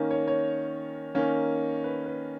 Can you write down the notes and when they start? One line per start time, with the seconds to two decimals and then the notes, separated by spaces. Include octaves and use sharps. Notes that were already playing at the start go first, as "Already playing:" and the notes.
Already playing: D#3 A#3 C#4
0.11 C#5
0.28 C#5
1.15 D#3 A#3 C#4
1.84 B4
2.06 B4